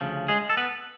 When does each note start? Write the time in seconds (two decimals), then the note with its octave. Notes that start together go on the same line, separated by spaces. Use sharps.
0.01 D2 C#3 F3
0.28 G#3 G#4
0.50 A4
0.57 B3 B4